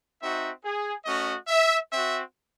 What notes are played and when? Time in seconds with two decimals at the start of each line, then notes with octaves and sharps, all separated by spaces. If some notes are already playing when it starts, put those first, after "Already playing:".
0.20 C4 D#4 F#4 E5
0.63 G#4
1.05 A3 C#4 F#4 D#5
1.47 E5
1.91 C4 F#4 E5